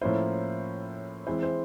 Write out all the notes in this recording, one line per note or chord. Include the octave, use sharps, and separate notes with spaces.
A2 F3 A#3 C#4 E4 C5
E3 G#3 C4 E4 C5
C5